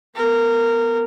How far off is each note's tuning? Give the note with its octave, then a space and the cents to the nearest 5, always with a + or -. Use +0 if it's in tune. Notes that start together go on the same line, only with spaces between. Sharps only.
B3 +0 A#4 -20